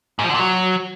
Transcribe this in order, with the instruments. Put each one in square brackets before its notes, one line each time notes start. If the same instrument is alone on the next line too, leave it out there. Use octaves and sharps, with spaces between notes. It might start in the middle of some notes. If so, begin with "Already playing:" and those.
[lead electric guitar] G#2
F3
D3
A#2
F#3